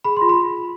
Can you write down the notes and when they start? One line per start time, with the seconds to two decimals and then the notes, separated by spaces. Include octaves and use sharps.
0.04 G#4 B5
0.17 F4 C6
0.29 B5